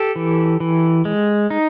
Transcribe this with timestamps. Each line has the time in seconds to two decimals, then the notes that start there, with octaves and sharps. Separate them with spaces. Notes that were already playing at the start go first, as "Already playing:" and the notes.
Already playing: G4 A4
0.16 E3
0.60 E3
1.05 G#3
1.50 D#4